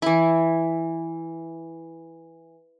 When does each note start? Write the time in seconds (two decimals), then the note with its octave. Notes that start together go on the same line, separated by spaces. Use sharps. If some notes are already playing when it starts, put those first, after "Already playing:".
0.02 E3 E4